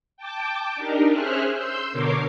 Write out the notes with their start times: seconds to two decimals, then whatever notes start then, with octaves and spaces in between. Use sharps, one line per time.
0.17 G5 A5 D6
0.75 D4 D#4 G4 A#4
1.10 C#4 G#4 C5 E5 F6 F#6
1.53 C6 E6 G6
1.92 B2 D3 A#4 C#5 D6 C7